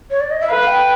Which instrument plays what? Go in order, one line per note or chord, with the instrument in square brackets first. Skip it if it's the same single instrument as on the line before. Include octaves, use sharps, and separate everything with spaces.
[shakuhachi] C#5
D5
D#5
E5
[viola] B4 [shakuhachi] F5
[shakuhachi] G5